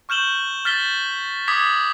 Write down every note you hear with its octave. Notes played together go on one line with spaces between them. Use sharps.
C#6 F6 G6 E7 F#7 G7
F6 A6 B6 G7
D6 D#6 G#6 B6